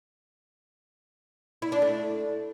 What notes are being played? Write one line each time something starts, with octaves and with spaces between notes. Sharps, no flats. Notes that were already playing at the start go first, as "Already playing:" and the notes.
E4
D4
A3